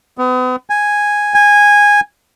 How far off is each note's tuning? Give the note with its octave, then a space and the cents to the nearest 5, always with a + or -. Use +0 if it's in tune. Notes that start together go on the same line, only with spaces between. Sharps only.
B3 +40
G#5 -5
G#5 -10